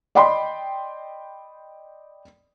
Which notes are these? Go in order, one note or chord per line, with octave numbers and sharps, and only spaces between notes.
D5 D#5 G5 B5 C6